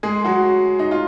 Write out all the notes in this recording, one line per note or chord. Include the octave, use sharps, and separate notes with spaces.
G#3 G#4
F#3 F#4
D#4
F4